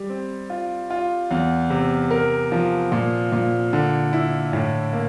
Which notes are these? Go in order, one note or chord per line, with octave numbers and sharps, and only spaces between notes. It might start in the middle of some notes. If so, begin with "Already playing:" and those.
Already playing: G3
C4
F4
F4
E2
C3
A#4
F3
A#2
A#2
D3
E4
A2
A#3